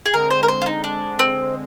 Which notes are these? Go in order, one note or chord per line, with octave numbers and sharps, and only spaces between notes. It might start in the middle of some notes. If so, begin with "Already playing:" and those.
G#4
D3 G#3 C4 A#4
C5
A#4
C5
F4
D#4
D4
C4